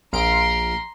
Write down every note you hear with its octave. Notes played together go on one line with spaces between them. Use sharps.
A#1 F5 A#5 C6 D7